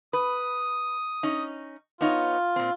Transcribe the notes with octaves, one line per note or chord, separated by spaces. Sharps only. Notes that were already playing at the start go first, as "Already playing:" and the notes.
B4 D#6
C#4 D#4
B3 D#4 F4 C#5
A#2 C4